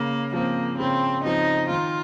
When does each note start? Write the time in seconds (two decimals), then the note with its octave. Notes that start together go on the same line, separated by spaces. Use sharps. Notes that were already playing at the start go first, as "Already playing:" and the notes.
Already playing: C#3 A#3
0.33 F3 A#3 C4
0.79 C#3 C4
1.25 F3 C4 D#4
1.70 D#3 F4